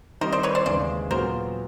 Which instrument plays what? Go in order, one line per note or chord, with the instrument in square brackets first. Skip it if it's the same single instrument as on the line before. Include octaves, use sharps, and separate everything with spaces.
[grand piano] D#3 G3 C4 D#4 [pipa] A#4 C5
[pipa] C5 D5
B4 C#5
C5 D5
[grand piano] D#2 C#3 E3 G#3 [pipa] C5 D5
[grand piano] A#2 F#3 B3 [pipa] A#4 C5